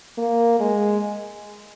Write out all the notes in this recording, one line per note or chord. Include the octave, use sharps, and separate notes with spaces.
A#3
G#3